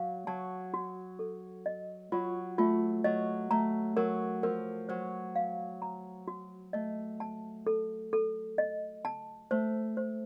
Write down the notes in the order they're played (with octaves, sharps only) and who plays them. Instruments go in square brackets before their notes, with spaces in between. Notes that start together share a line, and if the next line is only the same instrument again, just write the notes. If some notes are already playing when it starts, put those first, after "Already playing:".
Already playing: [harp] F#3 [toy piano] F5
[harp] F#3 [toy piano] A5
[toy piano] F#4
A4
D#5
[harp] F#3 [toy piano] F4
[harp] A3 [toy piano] F4
[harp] F#3 [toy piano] D#5
[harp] A3 [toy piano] A#5
[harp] F#3 [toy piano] A#4
[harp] F3 [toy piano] A#4
[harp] F#3 [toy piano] C5
[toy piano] F5
A#5
F#4
[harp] A3 [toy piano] D#5
[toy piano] A5
A4
A4
D#5
A5
[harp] A3 [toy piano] C5
[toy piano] C5